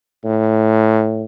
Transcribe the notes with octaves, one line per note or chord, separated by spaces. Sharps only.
A2